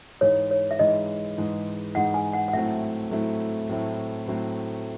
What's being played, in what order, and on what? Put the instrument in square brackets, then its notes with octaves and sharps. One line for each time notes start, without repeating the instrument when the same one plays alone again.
[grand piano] G#2 E3 G#3 D#4 [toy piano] C#5
[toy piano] C#5
E5
[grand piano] G#2 E3 G#3 D#4 [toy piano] D#5
[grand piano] G#2 E3 G#3 D#4
[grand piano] G#2 E3 G#3 D#4 [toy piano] F#5
[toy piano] G#5
F#5
F#5
[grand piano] A2 F#3 A3 C4 E4 [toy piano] E5
[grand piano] A2 F#3 A3 C4 E4
A2 F#3 A3 C4 E4
A2 F#3 A3 C4 E4